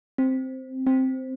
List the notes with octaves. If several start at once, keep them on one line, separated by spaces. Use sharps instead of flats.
C4
C4